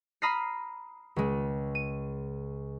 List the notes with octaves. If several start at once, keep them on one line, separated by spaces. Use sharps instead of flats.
A#5 B5 D#6 F6 A#6 C7
C#2 G#3
D#7